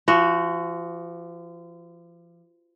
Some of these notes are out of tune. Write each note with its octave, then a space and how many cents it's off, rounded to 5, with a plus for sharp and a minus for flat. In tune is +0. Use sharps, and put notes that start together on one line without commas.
F3 -35 F#4 +0